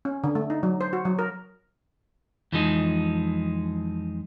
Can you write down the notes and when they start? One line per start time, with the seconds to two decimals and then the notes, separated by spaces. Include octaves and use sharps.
0.05 C#4
0.24 D3
0.35 A3
0.50 D#4
0.63 F#3
0.81 C5
0.93 F#4
1.05 F#3
1.19 A#4
2.53 F2 E3 F3 G#3 D#4